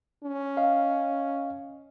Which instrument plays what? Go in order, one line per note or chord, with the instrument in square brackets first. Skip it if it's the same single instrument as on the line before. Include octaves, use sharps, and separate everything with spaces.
[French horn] C#4
[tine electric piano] D#5 F5